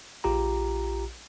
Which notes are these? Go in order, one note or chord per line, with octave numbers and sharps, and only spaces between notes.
A#1 F4 G4 A#5